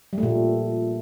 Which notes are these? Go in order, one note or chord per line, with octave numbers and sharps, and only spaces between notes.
G3
A3
A#2